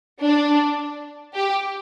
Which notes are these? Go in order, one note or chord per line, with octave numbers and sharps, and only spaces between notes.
D4
G4